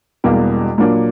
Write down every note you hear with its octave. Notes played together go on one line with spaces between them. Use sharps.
E1 E2 B2 G3 A#3
A#2 F#3 A#3 D4